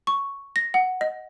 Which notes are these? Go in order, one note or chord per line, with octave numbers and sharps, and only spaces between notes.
C#6
A#6
F#5
D#5